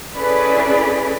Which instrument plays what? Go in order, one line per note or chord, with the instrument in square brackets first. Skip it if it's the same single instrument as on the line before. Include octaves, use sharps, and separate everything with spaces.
[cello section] C#4 E4 G#4 A4 B4 D5